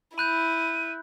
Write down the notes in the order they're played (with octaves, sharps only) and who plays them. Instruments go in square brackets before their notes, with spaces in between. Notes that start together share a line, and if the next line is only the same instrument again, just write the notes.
[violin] E4 [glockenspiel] B5 F#6 G6 [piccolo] D#7